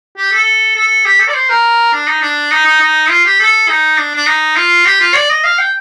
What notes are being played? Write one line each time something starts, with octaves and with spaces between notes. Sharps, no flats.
G4
A4
A4
G4
A4
D5
C5
A#4
D4
D#4
D4
D#4
D#4
D#4
F4
G4
A4
D#4
D4
D4
D#4
F4
G4
F4
D5
D#5
F5
G5